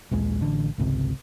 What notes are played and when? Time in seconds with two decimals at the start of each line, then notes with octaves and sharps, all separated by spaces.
0.11 A#1 D#2 G#3
0.41 A1 D3
0.78 G#1 C#2 C3